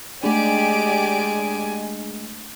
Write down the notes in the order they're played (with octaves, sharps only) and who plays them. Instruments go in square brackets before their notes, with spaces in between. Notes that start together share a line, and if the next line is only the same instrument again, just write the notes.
[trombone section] G#3 [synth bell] A3 D4 [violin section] G4 D5 D7 [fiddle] G#5